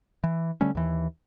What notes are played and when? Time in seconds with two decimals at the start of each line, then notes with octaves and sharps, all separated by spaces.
0.24 E3
0.61 D3 G3 A3 C#4
0.75 D#2 E3